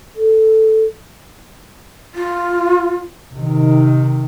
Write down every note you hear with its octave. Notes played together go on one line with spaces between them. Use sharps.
A4
F4
C3 D#3